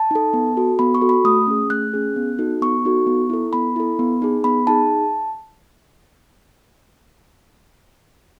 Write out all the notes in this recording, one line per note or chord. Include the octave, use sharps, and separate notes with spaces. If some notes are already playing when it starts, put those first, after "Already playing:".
Already playing: A5
D#4 A4
B3
F#4 A4
B3 B5
C#6
F#4 A4
B5
A3 D#6
C#4 G#4
A3 F#6
C#4 G#4
B3
D#4 F#4 A4
B3 C#6
D#4 F#4 A4
B3
E4 A4
B3 B5
E4 A4
B3
D#4 G#4
B3 B5
D#4 G#4 A5